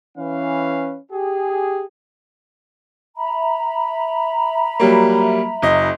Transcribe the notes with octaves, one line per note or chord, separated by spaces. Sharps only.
E3 C#4 B4 F5
G4 G#4
E5 A#5 B5
F#3 G3 A#3
F#1 D#5